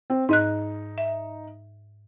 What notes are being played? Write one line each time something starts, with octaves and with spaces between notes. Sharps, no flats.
C4
G#2 D#4 D#5 F#6
E5